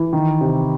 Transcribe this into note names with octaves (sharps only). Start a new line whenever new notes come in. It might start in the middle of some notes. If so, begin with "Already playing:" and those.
Already playing: E3
D#3
C3